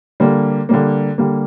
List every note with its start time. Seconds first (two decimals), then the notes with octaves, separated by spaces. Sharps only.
0.20 D3 G3 A#3
0.69 D3 G3 A#3
1.18 D3 G3 A#3